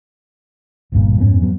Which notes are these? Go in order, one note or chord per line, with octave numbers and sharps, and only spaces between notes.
G1 D2 G2 A#2
F2 G#2 B3 C#4
F3 F#3 B3